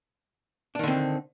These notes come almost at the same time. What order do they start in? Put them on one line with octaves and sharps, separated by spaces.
D4 D#3 D3 C4